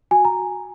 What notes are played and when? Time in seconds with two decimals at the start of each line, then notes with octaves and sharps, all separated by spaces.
0.11 F#4 G#5
0.25 A#5